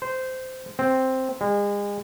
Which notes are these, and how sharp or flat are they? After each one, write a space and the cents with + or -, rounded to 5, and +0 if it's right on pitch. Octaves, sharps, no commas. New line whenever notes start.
C5 -15
C4 +0
G#3 -35